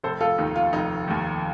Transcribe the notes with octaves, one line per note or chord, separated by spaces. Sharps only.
F1 A4 C5
F4 A4
D#2 D#3 D#4
F4
F1 D#4
D#2 D#3